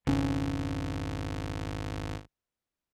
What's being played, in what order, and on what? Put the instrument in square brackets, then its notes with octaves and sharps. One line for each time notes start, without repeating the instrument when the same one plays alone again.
[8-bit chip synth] G#1 [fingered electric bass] F2 C#3 C#4